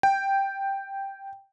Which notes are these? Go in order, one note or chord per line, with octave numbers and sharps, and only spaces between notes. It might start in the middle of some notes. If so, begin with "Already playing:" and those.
G5